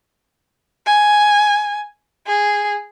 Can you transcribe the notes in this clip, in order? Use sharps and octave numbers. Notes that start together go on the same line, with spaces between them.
G#5
G#4